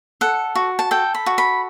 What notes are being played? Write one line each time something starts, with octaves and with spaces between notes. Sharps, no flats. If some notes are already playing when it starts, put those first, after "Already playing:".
A4 F#5
F#4
A5
A4 G5
B5
F#4
B5